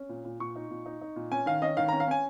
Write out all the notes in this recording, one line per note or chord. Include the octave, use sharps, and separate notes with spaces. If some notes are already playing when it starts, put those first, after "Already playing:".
Already playing: C#4
A#2
A#2
A#2 C#6
D#4
A#2
D#4
D#4
A#2
C#4 G#5
D#3 F5
C#4 D#5
D#3 F5
C#4 A#5
F5
C#4 G#5